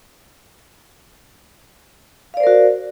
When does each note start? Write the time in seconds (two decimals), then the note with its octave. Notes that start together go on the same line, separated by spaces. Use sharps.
2.34 F5
2.37 D5
2.40 C5
2.43 A#4
2.47 F#4